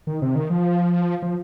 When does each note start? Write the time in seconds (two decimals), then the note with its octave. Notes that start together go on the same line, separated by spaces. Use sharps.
0.07 D#3
0.22 C3
0.35 D#3
0.50 F3
1.22 F3